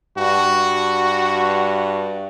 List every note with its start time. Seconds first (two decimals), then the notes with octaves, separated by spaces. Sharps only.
0.18 G2 F#4